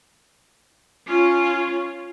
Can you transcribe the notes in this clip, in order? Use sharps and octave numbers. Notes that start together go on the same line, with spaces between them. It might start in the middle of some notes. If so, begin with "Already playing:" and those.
C#4 F4